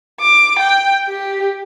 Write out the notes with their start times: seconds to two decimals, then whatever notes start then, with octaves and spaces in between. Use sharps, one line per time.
0.20 D6
0.60 G5
1.08 G4